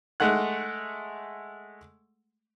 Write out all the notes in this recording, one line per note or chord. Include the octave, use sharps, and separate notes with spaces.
G#3 A3 F#5 F#6